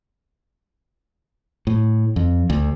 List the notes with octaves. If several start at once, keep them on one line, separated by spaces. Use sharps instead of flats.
A2
F2
D2